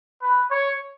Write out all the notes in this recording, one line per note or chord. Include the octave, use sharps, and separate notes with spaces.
B4
C#5